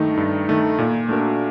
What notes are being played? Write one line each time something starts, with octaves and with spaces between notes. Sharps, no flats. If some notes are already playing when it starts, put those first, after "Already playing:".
Already playing: G2 D#3 A3 D#4
G2
D#3 A3 D#4
A#2
A3 D4 F#4 A#4